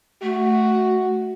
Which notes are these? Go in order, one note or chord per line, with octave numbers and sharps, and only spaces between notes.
A3 F#4